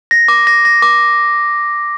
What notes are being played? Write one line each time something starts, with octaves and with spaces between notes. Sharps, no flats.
A#6
D6
A#6
A#6
D6